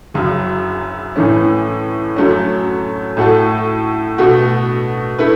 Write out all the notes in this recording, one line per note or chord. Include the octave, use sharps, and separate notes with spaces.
F#1 F#2 C#3 F#3
A2 E3 A3 C#4
F#2 F#3 A3 C#4
A2 A3 F#4 A4
B2 A3 F#4
A3 E4 B4